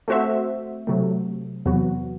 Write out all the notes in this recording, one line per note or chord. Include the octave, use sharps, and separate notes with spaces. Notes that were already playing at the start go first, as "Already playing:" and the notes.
A3 C4 F#4 C5 E5
C3 F#3 A3
E2 C3 F#3 B3 F#4